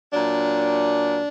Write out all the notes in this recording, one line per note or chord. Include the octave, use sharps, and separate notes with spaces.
A#2 F#3 D4